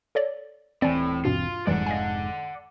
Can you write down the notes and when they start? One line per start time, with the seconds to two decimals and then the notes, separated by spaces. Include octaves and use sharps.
0.15 A4 C#5 D5
0.82 D#1 A2 E3 C4 D5 G#5
1.25 G2 B2 F4
1.67 F1 G#2 E3 G3 D5 F#5
1.86 D#5 F5 G#5